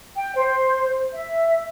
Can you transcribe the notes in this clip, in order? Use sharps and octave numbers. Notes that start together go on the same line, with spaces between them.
G5
C5
E5